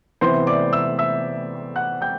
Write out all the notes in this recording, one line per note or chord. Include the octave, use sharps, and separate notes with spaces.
C3 E3 B3 C5 C6
D5 D6
E5 E6
E5 E6
F#5 F#6
G5 G6